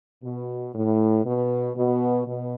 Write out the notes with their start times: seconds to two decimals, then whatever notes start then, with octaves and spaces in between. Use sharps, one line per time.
0.24 B2
0.75 A2
1.25 B2
1.76 B2
2.27 B2